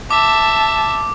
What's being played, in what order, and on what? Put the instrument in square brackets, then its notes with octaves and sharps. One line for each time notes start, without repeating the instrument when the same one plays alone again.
[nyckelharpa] E5 [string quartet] A5 [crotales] D6